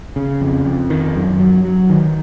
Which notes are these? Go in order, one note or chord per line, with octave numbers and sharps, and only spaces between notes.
C#3
F2
F2
D#3
F#2
F#3
F#3
D#3